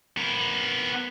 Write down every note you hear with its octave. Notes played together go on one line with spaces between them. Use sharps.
B3 A#4